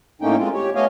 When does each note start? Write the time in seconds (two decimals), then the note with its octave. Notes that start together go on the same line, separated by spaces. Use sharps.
0.22 A2 A3 A#3 C#4 D#4 G5
0.38 G#3 C4 F4
0.54 G4 C#5
0.75 A3 B3 C#5 D#5 F5 G#5